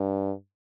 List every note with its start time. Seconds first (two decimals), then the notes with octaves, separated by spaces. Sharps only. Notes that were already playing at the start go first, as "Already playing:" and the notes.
Already playing: G2